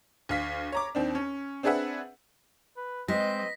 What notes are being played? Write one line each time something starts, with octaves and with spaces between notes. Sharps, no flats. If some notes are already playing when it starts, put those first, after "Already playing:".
D2 F5 B6
C#5 A#5 D6
D#2 C4 D4
C#4
C4 D4 G#4 B4 E5 F#5
B4
G#3 C4 B4 D#5 A#6 B6